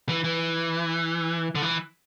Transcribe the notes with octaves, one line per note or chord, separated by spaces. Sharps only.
E3
E3
D3
E3